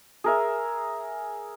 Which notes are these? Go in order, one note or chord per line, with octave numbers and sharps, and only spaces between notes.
G#4 A#4 E5